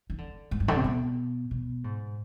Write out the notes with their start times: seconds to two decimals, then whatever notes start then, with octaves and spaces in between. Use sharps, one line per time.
0.10 D#3
0.18 D3
0.51 G#2
0.60 G2
0.68 D3
0.76 C3
0.84 B2
1.51 B2
1.84 G#2